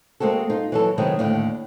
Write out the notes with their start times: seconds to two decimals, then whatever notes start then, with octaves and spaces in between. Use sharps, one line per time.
0.20 G#3 A#3 C4 F#4 A4
0.50 D#4 F4
0.72 E3 F#3 A4
0.98 C3 D#3 F#3 G#3 B3
1.19 D#2 A2 D3 D5